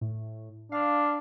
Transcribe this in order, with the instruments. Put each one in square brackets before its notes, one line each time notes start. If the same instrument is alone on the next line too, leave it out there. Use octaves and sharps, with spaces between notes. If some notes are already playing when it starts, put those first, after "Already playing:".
[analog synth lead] A2
[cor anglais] D4 [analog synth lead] F5